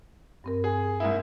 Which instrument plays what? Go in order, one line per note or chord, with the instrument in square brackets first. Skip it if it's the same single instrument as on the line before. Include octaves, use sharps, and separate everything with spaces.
[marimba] G2 C4 A#4
[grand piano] G#4
[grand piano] G#2 A#3 E4 [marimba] D#6